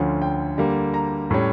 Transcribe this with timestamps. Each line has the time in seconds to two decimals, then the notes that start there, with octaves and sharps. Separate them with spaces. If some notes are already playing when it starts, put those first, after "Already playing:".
Already playing: D2 D3 F3 C#4
0.22 G5
0.58 D3 G3 A#3
0.94 A#5
1.31 A2 G3 C#4